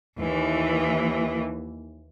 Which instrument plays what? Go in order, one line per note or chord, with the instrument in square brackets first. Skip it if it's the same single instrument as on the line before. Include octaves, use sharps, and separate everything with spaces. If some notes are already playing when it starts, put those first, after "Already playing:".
[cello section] D#2 E3